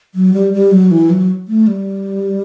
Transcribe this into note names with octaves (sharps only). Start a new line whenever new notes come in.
F#3
G3
G3
F#3
E3
F#3
A3
G3